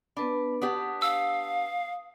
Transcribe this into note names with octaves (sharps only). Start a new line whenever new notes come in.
B3 D4 B4 B5
B3 D4 G4 D#6
F5 E6